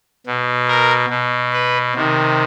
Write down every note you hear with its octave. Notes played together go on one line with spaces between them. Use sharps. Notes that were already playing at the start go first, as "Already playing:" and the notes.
B2
A#4
B2
B4
C3 D#3